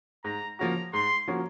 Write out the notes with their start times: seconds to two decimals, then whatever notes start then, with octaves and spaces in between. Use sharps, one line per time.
0.25 G#2 A#5
0.59 F3 A#3 C#4 F#4 A#5
0.93 G#2 C6
1.27 F3 A#3 C#4 F#4